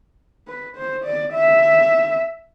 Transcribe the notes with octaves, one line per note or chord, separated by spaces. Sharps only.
B4
C5
D5
E5